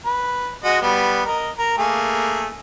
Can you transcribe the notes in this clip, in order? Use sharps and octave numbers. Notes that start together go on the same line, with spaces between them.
B4
G#3 F#4 D#5
G3 B3
A#4 D#5
A#4
A3 A#3 G#4